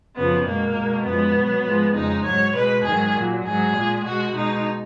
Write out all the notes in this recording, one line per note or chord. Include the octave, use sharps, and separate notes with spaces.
F#2 C#3 F3 B3
B2 G#3 A#3
B2 G#3
F#2 F3 G#3 B3
B2
F#3
G#2 F3 G#3
F2 C#3 G#3 D#4
G#2 F#3 C#5
B2 G#3 B4
G#2 D#3 F#3 G#4
A#2 F#3
G#2 F#3 G#4
A#2 G#3
B2 G#3 F#4
B2 G#3 D#4